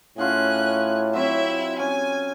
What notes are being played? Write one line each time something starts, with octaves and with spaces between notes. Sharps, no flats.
A2 C#4 F4 F#4 G#4 F#6
F#3 C4 E4 E5
C#4 G#5